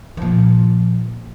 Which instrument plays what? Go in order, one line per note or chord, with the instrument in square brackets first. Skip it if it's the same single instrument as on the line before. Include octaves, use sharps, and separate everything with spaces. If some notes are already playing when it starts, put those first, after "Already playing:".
[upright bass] A#2 F3